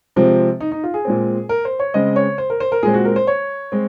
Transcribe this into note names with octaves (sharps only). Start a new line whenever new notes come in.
C3 F3 G#3 C4
D#4
D#4
F4
G#4
A#2 G#3 C4
A#4
C5
C#5
C#3 G#3 C4 D#5
C#5
C5
A#4
C5
A#4
A#2 G#3 C4 G#4
F#4
A#4
C5
C#5
G#3 C4